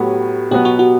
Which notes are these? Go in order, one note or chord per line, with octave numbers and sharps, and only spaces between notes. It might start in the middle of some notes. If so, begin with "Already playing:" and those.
Already playing: A2 F#3 B3 G4
B2 F#3 B3 G4
F#4
F#4